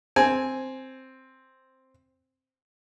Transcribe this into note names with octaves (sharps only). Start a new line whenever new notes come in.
C4 G#5